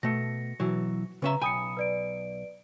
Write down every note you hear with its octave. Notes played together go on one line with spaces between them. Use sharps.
B2 A3 A#6 C#7
B2 E3 F#3
C#3 C#4 B4 E5 A#5
B1 G5 G#5 B5 D#6 C#7
B4 D5 D7